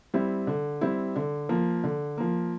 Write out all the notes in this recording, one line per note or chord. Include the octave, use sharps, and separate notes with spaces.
G3 C4 E4
D3
G3 C4 E4
D3
F3 A#3
D3
F3 A#3